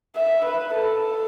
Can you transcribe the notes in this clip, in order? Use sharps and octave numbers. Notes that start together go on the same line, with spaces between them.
E5
B4
A4